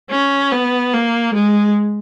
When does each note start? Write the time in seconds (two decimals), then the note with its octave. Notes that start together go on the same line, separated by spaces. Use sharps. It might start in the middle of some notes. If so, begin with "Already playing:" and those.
0.11 C#4
0.52 B3
0.94 A#3
1.35 G#3